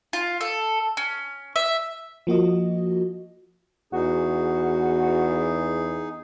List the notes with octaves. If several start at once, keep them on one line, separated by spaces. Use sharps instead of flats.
F4
A4
C#4
E5
F3 A#3 F#4 D#5
E2 D#4 F#4 G#4